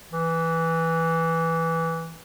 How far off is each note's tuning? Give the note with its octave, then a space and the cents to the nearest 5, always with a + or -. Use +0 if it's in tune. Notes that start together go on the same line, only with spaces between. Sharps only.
E3 -5